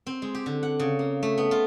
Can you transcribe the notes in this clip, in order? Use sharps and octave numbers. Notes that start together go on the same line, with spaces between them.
C4
G#3
G4
D3
F#5
C#3
A#3
A3
B3
F4